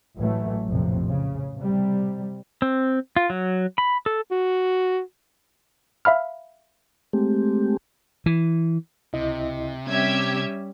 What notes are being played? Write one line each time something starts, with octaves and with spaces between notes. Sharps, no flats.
A1 E3 F#3 A3
A#1 F2 A2 C3
C#3
C3 G3
C4
F4
F#3
B5
A4
F#4
E5 F5 B5 F6
G#3 A3 C4 G4
E3
C#2 C3 E4 D#5
G3 C4 C#4 G4 E5 G#6